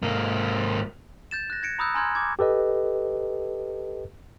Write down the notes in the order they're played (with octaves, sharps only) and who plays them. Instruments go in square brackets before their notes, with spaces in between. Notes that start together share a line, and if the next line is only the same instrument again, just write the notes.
[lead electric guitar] G#2 A#3
[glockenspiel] G6 A6 E7
F#6 A#6
G#6 A#6 C#7 D7
A#5 B5 D#6 E6 F#6 G6
G#5 A#5 C6 F6 G6 G#6
D6 G#6
[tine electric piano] G4 A4 B4 D#5